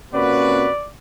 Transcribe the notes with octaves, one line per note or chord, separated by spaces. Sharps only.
C3 A#3 C#4 F#4 B4 D5